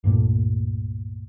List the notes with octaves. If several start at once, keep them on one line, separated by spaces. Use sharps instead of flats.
C#2 G2 A#2 A3